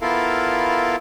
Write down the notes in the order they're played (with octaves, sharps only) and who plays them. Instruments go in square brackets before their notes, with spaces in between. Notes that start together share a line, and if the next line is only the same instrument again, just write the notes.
[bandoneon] B3 E4 F4 A4 A#4 F5